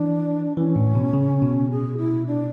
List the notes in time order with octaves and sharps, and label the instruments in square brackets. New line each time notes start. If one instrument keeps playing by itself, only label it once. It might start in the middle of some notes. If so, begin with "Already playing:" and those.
Already playing: [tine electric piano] E3 [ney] D4
[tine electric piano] E3 [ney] C#4
[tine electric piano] A2
B2
C#3
B2
[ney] G#4
E4
D4